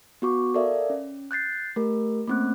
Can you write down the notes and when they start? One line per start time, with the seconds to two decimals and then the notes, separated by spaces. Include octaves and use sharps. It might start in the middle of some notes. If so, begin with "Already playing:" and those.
0.22 B3 F#4 C#6 D6
0.54 A4 A#4 D5 E5 F5
0.90 C#4
1.31 F#6 G6 A6 C7
1.76 A3 G4 A#4
2.27 A3 A#3 C4 C#4 F#6